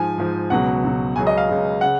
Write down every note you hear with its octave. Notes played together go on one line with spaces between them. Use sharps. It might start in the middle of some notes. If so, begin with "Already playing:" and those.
Already playing: G#2 F3 G#5
G#2 F3
C#2 B2 F#3 F#5
C#2 B2 F#3
C#2 C#3 F#3 G#5
D#5
F5
C#2 C#3 F#3
C#3 F#5